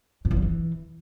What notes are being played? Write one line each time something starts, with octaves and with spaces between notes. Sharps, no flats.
F#2
E2
F#3
E3